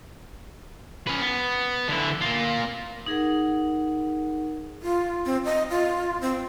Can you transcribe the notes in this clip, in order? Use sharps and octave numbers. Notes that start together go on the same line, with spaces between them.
C#4 B4
B3
D3 E4
A#3 F4
D#4 G#4 A#4 F#5
F4
C4
D#5
F4
C4